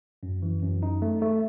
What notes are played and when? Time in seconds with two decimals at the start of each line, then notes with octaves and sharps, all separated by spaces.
0.23 F#2
0.42 E3
0.63 F#2
0.83 D#4
1.02 A3
1.22 A3